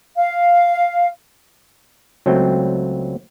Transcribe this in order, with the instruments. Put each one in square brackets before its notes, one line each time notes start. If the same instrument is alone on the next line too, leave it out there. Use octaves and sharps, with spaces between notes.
[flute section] F5
[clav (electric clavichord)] C#2 F#3 A3 C4 G5